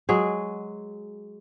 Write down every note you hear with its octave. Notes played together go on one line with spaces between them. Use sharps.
F#3 G#3 G#4